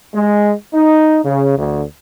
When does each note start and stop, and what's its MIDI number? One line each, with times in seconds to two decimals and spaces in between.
0.13 0.50 56
0.73 1.19 63
1.25 1.56 49
1.57 1.82 38